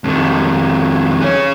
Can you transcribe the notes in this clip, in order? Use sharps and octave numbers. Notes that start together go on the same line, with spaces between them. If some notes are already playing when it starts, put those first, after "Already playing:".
F2 D#3
G#4 C#5